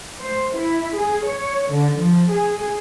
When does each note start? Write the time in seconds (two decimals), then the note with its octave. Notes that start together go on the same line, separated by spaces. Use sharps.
0.19 C5
0.56 E4
0.97 G#4
1.27 C#5
1.71 D3
2.00 F3
2.31 G#4